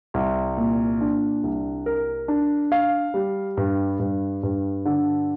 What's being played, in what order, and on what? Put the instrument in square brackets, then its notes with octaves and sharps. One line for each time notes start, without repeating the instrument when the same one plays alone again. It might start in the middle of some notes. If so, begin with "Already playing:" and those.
[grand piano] C2
A#2
D4
C2
A#4
D4
F5
G3
G2
G2
G2
D3